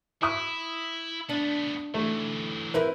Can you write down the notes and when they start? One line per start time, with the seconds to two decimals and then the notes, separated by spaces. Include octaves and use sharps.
0.22 E4 E5 C#6 D#6
1.29 A3 B3 D4
1.94 E3 F#3 A3
2.74 C4 E4 A#4 B4